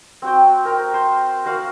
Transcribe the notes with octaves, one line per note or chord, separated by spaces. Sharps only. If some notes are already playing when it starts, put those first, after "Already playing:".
C4 F#4 G5
A#4 G5 A#5 C6
C5
F#4 A#4 F5 F#5